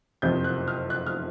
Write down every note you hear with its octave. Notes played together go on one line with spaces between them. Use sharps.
F#1 F2 C3 G6
F#6
F6
F#6
F6